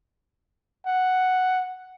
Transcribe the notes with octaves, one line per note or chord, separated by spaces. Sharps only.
F#5